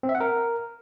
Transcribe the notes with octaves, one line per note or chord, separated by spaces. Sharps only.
C4
E5
F#5
A#4